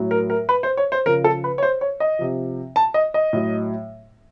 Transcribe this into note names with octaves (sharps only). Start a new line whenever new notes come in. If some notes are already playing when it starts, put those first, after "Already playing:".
Already playing: A2 F#3
A#4
A#4
B4
C5
C#5
C5
C#3 F3 A#4
A4
B4
C#5
C5
C#5
D#5
C3 F3
A5
D#5
D#5
A2 F#3